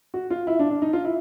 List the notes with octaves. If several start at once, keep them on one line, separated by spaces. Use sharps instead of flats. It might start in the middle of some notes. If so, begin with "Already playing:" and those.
F#4
F4
E4
D4
D4
D#4
F4
E4